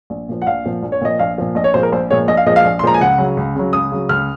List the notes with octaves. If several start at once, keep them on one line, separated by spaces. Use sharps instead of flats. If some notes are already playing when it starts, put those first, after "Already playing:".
A#1
A#2 F3
F#5
A#1 F5
A#2 F3
A#1
C#5
A#2 F3 D#5
A#1 F5
A#2 F3
A#1 D#5
C#5
A#2 F3 G#3 C5
A#4
A#1 C5
A#2 F3 G#3 C#5
A#1 D#5
F5
A#2 F3 G#3 D#5
F5
A#1
C6
A#2 F3 G#3 A#5
G#5
C#2 F#5
C#3 F#3
C#2
C#3 F#3
C#2 D#6
C#3 F#3
C#2 F6